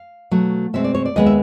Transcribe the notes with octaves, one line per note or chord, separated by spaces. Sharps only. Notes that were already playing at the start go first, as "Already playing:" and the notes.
Already playing: F5
B2 F#3 A3
B2 G#3 C4 E5
D5
C#5
D5
D#2 D#3 G#3 B3 D#5
E5